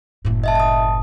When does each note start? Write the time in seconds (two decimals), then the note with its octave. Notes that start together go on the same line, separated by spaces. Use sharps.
0.25 F#1 A2
0.44 D#5 E5 A5
0.55 A5 D#6